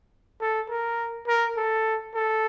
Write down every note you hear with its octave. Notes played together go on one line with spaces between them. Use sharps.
A4
A#4
A#4
A4
A4